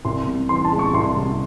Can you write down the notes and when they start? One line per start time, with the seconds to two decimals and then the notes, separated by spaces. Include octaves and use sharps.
0.05 C2 C6
0.27 C3
0.49 E3 C6
0.65 A5
0.72 G#3
0.79 C#6
0.93 C2 C6
1.17 C3